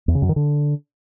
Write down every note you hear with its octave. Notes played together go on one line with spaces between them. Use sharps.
E2
C#3
F#2
D#3
D3